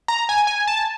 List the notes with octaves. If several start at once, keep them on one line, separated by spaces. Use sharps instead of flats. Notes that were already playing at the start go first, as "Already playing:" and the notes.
A#5
G#5
G#5
A5